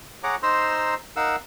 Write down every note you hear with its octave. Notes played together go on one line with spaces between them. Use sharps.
G#4 C#5 F#5 A#5 D6
D#4 C5 A#5 C6 E6
D#4 A#4 F5 F#5 E6